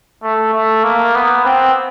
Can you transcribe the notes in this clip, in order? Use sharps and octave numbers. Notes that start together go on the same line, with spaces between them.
A3
A3
A#3
B3
C4